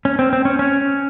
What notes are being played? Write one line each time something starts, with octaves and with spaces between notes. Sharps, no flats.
C#4
C4
C4
C#4
C#4